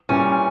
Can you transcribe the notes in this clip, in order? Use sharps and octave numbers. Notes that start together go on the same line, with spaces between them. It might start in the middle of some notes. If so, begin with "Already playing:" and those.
A#2 G3 B3 C#4 E4